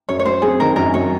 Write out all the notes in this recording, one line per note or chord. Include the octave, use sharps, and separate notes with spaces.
F#2 C#5
C#5
F#3 C5
C4 G#4
D#3 A#4
F#2 A#4
F#3 C#5